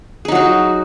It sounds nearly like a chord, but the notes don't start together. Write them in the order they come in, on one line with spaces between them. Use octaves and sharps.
G#4 D#4 F#3 F#4